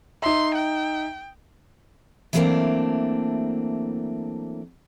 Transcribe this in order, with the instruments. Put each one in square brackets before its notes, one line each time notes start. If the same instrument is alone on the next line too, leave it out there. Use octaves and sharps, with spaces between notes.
[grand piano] D#4 E5 [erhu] C6
[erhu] G5
[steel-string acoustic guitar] E3 F#3 A3 A#3 C4 D4